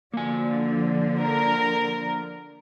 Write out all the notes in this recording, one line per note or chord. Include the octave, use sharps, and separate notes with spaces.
D3 F3 A#3 G#5
A#4